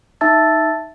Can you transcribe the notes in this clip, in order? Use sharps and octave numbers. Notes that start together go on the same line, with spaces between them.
D#4 E5 A5 E6 A6